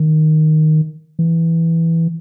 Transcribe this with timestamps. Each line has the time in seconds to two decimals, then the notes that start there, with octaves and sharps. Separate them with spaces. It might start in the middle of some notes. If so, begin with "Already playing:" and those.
Already playing: D#3
1.19 E3